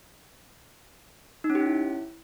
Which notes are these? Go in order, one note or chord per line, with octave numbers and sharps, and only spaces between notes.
D#4
C#4
G4
C#4
E4